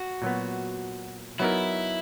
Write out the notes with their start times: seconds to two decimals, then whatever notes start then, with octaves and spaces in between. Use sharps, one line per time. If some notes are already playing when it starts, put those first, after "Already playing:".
Already playing: F#4
0.22 A#2 F#3 B3
1.39 F#3 B3 D#4 E4 A#4